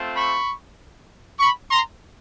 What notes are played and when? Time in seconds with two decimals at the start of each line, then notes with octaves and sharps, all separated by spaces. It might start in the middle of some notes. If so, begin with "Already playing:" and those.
Already playing: A3 C4 F4
0.16 B5 C#6
1.40 B5 C#6
1.71 A#5 C6